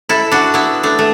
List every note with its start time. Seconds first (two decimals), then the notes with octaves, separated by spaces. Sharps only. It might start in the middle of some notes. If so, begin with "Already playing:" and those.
0.09 E4 A4
0.31 D4 F#4
0.54 B3 E4
0.83 A3 D4
0.99 A3